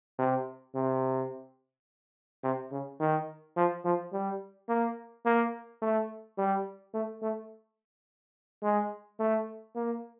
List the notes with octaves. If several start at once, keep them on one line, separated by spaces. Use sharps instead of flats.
C3
C3
C3
C#3
D#3
F3
F3
G3
A#3
A#3
A3
G3
A3
A3
G#3
A3
A#3